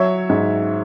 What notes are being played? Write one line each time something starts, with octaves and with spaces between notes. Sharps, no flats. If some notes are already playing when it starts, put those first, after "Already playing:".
Already playing: F#3 C#5 E5
G#2